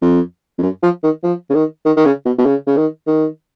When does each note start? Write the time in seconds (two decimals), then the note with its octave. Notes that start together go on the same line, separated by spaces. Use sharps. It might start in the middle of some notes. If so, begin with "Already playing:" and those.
0.02 F2
0.58 F2
0.63 F#2
0.83 F3
1.03 D#3
1.23 F3
1.50 C#3
1.54 D#3
1.85 D#3
1.97 D#3
2.05 C#3
2.25 B2
2.38 B2
2.46 C#3
2.67 C#3
2.77 D#3
3.07 D#3